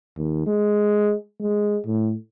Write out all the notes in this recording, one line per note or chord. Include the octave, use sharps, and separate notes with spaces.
D#2
G#3
G#3
A2